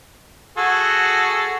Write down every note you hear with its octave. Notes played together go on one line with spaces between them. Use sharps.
F#4 G#4 A4